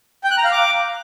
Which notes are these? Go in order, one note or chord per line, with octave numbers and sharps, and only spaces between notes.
G5
F#6
A#5
F5
D6